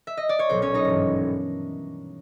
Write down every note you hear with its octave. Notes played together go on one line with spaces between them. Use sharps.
E5
D#5
D5
C#5
B1 A#2 F#3 C5
C#4 C#5
D#4 D#5
G#1 G2 E3